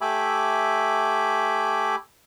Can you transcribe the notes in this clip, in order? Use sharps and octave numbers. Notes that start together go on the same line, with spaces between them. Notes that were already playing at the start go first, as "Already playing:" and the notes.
A3 G4 E5 G#5 B5 D6